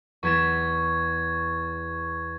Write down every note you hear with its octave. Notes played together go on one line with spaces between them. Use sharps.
E2 C#6 G#6 A6 B6 E7